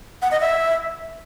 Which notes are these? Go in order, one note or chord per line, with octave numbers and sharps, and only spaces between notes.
F#5
D#5
E5